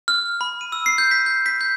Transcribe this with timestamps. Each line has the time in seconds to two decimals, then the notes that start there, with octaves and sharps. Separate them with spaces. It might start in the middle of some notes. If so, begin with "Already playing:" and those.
0.08 F6
0.41 B5
0.61 D#7
0.72 E6
0.86 C7
0.98 G6
1.11 B6
1.26 G6
1.46 B6
1.61 G6